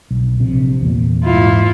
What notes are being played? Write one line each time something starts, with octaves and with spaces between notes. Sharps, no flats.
B1
A#1 C3
E2 A#2
G#2 E4 F4